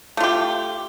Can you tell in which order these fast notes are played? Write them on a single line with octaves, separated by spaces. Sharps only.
A3 F4 G4